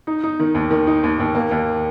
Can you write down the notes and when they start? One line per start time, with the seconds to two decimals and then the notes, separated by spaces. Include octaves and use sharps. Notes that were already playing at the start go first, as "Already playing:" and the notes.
0.07 D#4
0.23 D#4
0.40 D#3
0.55 D#2
0.71 D#3
0.87 D#4
1.03 D#2
1.20 D#2
1.35 A#3
1.51 D#2